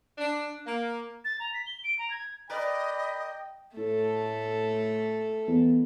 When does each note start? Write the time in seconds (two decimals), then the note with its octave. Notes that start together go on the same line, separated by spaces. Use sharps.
0.18 D4
0.65 A#3
1.25 A6
1.40 A#5
1.54 B6
1.67 G7
1.84 D7
1.99 A#5
2.10 G#6
2.50 A#4 B4 D5 D#5 G5 B5
3.77 A2 A3 A4
5.47 E2